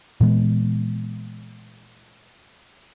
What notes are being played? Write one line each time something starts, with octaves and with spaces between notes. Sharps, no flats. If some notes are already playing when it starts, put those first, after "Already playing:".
A#2 E3 G#3 B3